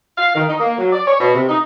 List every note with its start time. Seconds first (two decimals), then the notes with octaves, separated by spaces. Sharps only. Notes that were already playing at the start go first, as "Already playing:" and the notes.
0.18 F5
0.34 D#3
0.48 D#4
0.60 A#3
0.78 F#3
0.92 D5
1.07 C#5
1.19 B2
1.35 C3
1.49 D#4